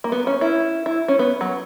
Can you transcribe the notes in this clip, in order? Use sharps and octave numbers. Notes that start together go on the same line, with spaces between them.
A#3
B3
C#4
E4
E4
C#4
B3
F#3